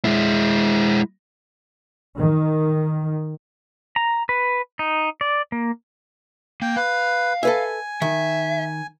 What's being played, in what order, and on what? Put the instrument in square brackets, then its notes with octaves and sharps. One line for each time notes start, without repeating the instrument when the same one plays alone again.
[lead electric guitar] G#3 E4
[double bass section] D#3
[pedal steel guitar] A#5
B4
D#4
D5
A#3
[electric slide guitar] A#3 [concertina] G5
[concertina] B4 [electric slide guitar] F5
[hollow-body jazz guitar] A4 B4 E5 [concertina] G#5
[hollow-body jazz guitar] D#3 [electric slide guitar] E5